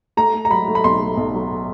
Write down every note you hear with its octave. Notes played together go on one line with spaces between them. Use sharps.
A3 A#5
A3
A#5
F#3 B5
A3
B5
B1 C6
A3
B1
F#3